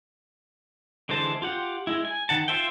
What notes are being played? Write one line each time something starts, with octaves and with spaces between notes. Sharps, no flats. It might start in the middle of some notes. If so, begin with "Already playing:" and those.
D3 E3 G#3 C5 A5
F4 G4 F#5
G#3 E4
G#5
D#3 F#5 A5
F4 C5 E5 G5